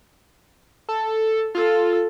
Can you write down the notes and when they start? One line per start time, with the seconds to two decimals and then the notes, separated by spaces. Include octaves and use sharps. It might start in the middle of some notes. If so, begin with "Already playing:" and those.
0.89 A4
1.55 F4 A4